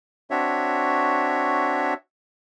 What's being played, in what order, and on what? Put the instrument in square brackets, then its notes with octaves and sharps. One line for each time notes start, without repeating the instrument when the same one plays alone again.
[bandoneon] C4 D4 F#4 C#5 E5